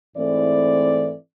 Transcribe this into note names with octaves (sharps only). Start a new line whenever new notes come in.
G#2 E3 A3 C4 E4 D5